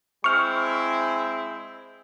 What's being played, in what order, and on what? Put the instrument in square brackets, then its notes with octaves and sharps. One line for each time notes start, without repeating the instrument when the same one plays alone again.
[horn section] G#3 C4 E4 [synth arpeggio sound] C#6 F6